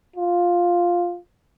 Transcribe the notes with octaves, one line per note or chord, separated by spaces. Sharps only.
F4